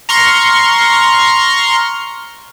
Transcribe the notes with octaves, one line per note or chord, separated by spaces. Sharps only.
A#5 C6 C#6 F6